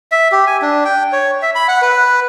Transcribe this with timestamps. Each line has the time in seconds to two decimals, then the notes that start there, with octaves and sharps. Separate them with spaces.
0.12 E5
0.32 G4
0.47 G#5
0.62 D4
0.85 G5
1.13 C#5
1.42 E5
1.55 B5
1.68 F#5
1.82 B4